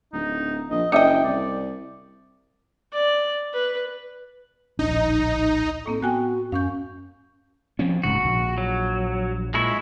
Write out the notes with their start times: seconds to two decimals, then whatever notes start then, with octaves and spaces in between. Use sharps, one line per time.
0.13 D1 D#4
0.70 A#1 D#5
0.92 F#1 D4 D#5 E5 G5 D#6 C#7
1.24 C2 D5
2.93 D5
3.53 B4
4.79 D1 A#1 D4 D#4
5.86 A2 A#3 C4 A4
6.02 B3 F#4 G5 G#5 F#6
6.52 F#2 C#4 F5 C#6 G6
7.79 F3 C4 C#4
8.03 D1 G#2 C#3 F#4
8.24 A#1
8.58 F#3
9.54 A#2 G#3 E4 C#6